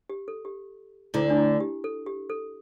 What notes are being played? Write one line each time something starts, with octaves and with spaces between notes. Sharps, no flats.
G4
A4
G4
D2 D3 E4
D4
E4
G4
A4
G4
A4